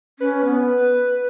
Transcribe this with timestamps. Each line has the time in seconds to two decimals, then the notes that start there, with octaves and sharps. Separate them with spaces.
0.19 C#4 B4
0.45 B3